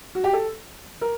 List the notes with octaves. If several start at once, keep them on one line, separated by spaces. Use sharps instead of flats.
F#4
G4
A4
A#4